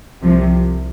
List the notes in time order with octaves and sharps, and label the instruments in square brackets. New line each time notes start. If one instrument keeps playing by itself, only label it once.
[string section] C2 C3 F3